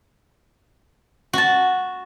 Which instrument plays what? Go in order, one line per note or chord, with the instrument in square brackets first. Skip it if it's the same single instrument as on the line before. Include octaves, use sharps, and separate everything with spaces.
[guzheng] F#4 A5